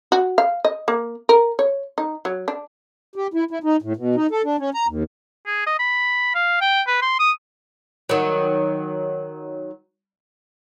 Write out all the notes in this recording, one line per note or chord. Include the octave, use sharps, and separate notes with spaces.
F#4
F5
D#5
A#3
A#4
C#5
D#4
F#3
D4
G4
E4
E4
D#4
A2
B2
D#4
A4
D4
C#4
A#5
D#2
G#4
D#5
B5
F5
G5
B4
C6
D#6
D#3 F#3